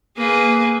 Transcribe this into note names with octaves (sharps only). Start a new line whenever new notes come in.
A#3 G#4 B4